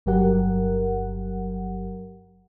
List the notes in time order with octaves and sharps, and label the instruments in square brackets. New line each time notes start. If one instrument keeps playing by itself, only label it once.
[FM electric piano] G1 G2 F#3 G4 A#4 F#5